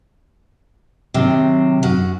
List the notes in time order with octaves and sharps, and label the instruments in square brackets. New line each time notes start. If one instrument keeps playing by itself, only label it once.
[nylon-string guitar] C3 [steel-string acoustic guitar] D#3 F#3
[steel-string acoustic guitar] F#2 F#4